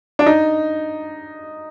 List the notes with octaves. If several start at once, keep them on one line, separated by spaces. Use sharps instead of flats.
D4
D#4